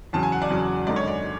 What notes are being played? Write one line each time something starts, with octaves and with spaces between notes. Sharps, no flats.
E2 C#3 F#3 A5
G#5
F#5
D5
E2 C#3 F#3
G#1 F#2 D3 G#3 D5
C#5
D5